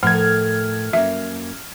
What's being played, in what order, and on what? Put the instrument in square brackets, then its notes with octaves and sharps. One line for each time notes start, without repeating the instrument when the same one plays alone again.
[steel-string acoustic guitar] A2 A4 A#4 [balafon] F3 F#5 [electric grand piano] F6 G#6
[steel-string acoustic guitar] F#2 A#3 [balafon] E5